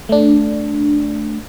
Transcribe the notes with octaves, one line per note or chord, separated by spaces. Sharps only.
A3 D4